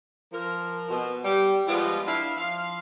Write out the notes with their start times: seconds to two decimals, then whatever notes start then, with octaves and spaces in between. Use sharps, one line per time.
0.33 F3 A#4
0.90 B2
1.25 G3
1.67 F3 G3 G#3 B3 F4
2.07 D4 E4 F5
2.38 F3 F5